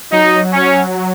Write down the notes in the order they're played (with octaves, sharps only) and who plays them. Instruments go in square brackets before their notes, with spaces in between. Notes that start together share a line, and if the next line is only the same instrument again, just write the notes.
[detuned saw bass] F#3 [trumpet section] D#4
[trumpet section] C#4